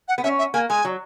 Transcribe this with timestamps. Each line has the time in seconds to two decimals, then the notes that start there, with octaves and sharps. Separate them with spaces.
0.08 F#5
0.18 B3
0.24 C#4 E5
0.39 E5
0.54 A#3 G#5
0.69 G#3 G#5
0.85 F#3